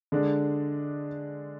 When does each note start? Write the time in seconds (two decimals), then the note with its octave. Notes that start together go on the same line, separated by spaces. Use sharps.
0.12 D3 G#3 D4